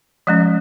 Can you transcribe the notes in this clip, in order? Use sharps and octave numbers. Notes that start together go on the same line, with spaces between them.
F3 G#3 C#4 D#5